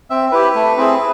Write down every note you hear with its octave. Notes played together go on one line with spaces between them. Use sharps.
C4 E5
E4 G4 B4
A3
C4 E4 G#4